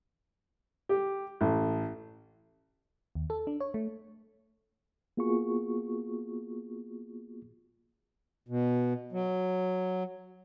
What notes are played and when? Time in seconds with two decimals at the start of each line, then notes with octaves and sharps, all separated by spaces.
0.89 G4
1.41 A1
3.15 D#2
3.30 A4
3.47 D4
3.60 C#5
3.74 A3
5.17 A#3 B3 F4 F#4 G#4 C#6
8.49 B2
9.12 F#3